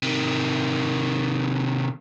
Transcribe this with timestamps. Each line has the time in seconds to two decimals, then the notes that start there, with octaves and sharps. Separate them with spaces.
0.03 C3 D#3